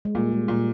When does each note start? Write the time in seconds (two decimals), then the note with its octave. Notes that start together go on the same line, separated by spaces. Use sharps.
0.05 G#3
0.15 A#2 G3
0.32 G#3
0.48 A#2 G3